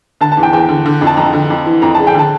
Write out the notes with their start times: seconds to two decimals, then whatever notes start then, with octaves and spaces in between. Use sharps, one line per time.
0.21 D3 A5
0.32 A5
0.37 E2
0.43 G5
0.53 E2 G5
0.69 D3
0.86 D3
1.01 F2
1.07 A5
1.17 F2 A#5
1.33 D3
1.50 F2
1.66 E3
1.82 F2 A#5
1.95 C#3 A5
2.07 G5
2.14 D3 A5